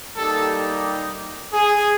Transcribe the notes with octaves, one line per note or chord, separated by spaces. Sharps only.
G3 A#3 D#4 G4 A4
G#4